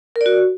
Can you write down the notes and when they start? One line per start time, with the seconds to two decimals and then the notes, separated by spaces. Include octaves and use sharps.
0.16 A#4
0.21 D5
0.26 F#4